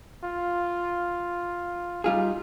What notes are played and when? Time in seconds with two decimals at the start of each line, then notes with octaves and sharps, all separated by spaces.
0.23 F4
2.04 G3 D#4 F4 G#4